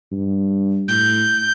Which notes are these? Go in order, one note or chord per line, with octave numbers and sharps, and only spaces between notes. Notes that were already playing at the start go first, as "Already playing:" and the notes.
G2
A2 G6